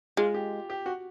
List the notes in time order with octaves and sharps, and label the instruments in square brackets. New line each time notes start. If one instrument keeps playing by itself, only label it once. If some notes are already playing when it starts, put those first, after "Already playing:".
[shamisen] G#3 [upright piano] F4
[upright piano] G4
G4
F#4